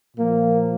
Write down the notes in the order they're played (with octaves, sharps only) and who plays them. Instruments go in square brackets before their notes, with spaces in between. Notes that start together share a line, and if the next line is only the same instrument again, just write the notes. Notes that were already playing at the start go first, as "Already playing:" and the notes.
[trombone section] A#2 F3 A#3